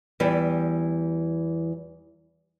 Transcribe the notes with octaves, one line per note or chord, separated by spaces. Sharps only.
E2 E3 G3 B4